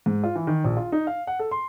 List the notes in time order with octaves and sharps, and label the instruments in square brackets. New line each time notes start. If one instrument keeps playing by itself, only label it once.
[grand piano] G#2
F4
E3
D#3
A#1
F4
D#4
F5
F#5
A4
C6